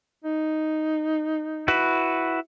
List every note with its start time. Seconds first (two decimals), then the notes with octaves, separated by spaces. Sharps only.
0.24 D#4
1.68 E4 F#4 B4